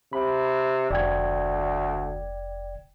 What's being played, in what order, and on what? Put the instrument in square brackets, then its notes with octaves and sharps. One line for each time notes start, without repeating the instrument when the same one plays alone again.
[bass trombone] C3 [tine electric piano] B5
[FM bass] F1 [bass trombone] D2 [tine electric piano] D5 G5 G#6